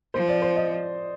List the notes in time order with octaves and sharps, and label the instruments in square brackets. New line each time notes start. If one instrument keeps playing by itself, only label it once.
[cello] F3 [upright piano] C5
[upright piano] D5
C5
D#5